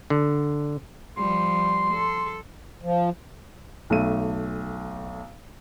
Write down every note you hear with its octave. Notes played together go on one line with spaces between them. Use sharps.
D3
F3 G3 C6
A4
F3
B1 A3 D#7